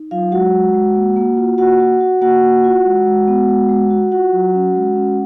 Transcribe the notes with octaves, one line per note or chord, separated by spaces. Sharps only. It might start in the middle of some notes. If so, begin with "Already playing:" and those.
Already playing: D#4
F#3 F4 F5
G#3 F#4 F#5
G#3
G#3
A#3
A#3
F4
A#3 F#4 F#5
F#4
F#4
A#3 F#4 F#5
A#3
F4
G#3
G#3
B3
G#3
G#3
F#4
F4 F#4 F#5
F#3
C#4
G#3
C#4